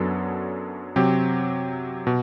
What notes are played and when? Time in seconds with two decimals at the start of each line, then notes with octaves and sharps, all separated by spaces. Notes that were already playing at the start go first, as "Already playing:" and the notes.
Already playing: F#2 F#3 B3 D4 A4
0.96 C3 F#3 C4 G4
2.07 B2